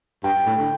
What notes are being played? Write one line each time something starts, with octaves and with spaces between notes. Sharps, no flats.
G2 G5
A2
D3